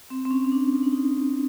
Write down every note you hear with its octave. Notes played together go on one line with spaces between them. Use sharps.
C4
C4
C#4
C#4
D4
D#4
D4
D#4